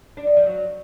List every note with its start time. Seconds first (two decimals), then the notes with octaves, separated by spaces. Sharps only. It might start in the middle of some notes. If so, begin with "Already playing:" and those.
0.17 D4
0.27 D#4
0.37 F3
0.46 F#3